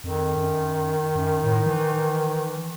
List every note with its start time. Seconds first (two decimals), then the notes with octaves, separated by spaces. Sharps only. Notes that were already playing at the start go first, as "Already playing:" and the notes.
0.04 F2 D#3
0.37 F#2
1.15 F#2
1.44 A2
1.66 E3